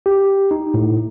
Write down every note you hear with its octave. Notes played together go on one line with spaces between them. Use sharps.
G4
D#4
A2